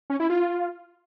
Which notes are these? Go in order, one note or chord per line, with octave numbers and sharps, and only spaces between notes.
C#4
E4
F4